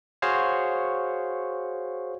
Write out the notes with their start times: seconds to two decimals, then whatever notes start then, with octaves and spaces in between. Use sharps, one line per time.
0.22 F#4 G#4 C5 C#5 F5